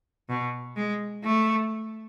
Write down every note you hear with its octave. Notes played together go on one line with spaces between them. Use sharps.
B2
G#3
A3